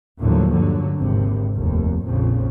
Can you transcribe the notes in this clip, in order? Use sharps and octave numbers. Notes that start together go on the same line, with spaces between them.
D#2 A2 D3 F3 F#3
G2 D3 F#3
G#1 D#2 C3
F1 D#2
A#1 F2 C#3